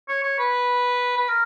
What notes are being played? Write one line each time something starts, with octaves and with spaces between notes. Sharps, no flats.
C#5
C#5
B4
B4
A#4